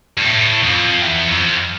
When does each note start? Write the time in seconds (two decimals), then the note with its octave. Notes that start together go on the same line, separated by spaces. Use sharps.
0.17 G2
0.24 A2
0.63 F2
1.02 E2
1.28 F2